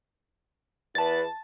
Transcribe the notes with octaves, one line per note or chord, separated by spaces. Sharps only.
E2 E4 B4 A5 A6